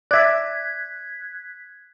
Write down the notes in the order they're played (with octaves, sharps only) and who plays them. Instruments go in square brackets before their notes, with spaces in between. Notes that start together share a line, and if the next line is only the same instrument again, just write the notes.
[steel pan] D5 E5 [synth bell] F#6 G#6 B6